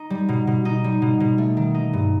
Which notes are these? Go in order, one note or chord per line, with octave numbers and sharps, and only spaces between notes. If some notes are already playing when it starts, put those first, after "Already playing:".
Already playing: D#4
G3
B2
B2
D#4
G3
B2
B2
A3
D#3
D#4
G2